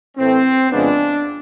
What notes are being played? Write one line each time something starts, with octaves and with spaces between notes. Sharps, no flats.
A2 E3 A3 C4
F2 C#3 F3 G#3 B3 D4